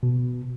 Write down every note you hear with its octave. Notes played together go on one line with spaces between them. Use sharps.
B2